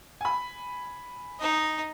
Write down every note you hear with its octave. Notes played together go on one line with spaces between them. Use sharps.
G#5 B5
D#4 D#5